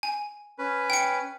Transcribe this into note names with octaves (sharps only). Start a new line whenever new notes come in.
G#5
C#4 B4
G5 C#7